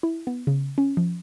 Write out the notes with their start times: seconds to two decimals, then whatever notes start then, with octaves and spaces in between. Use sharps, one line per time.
0.03 E4
0.27 B3
0.47 C#3
0.78 C#4
0.97 F3